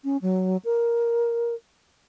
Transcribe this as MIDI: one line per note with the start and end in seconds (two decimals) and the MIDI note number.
0.04 0.17 61
0.22 0.57 54
0.65 1.55 70